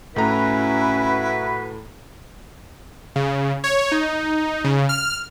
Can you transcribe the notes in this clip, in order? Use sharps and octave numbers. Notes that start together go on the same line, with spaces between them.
A2 C#4 E4 F#4 B4 A#5
C#3
C#5
D#4
C#3
F6